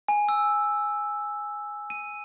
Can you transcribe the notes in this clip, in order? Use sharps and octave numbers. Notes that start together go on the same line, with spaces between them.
G#5
E6
D#7